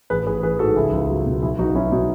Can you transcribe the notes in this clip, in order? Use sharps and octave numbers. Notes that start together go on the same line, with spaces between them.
A1 G#4 B4
A1 G#4 B4
E3 G#4 B4
G#2 F#4 A4
C#2 E4 G#4
C#2
F#3
B2
B1 E4 G#4
B1 D#4 F#4
F#3 C#4 E4
B2 D#4 F#4